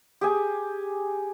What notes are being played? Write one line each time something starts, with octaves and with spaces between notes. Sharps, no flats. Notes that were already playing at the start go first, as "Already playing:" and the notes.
G4 G#4 G#5